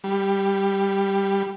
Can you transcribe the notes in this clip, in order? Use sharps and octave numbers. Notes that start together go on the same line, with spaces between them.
G3